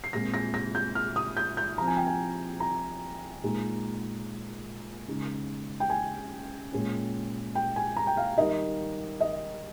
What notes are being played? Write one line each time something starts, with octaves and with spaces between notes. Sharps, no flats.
C7
A#2 G#3 C4 F4 A#6
A#6
A#6
G6
F6
D#6
G6
G6
F3 C4 F4 A#5
G#5
G5
G#5
A#5
A#2 G#3 D#4
C#3 G#3 D#4
G5
G#5
A#2 G#3 C#4
G5
G#5
A#5
G5
F5
D#3 G3 A#3 D#4 D#5
D#5